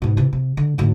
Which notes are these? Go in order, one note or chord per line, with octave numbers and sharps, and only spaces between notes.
G#2 B2
C3 E3
C3
D3
D2 G#2